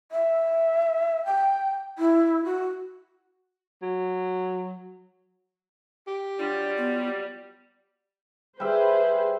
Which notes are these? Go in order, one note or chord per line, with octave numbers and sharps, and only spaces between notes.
E5
G5
E4
F#4
F#3
G4
F#3 G3 D4 F4
B3
G3 G#4 B4 C5 E5